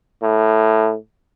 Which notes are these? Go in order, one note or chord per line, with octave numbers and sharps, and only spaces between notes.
A2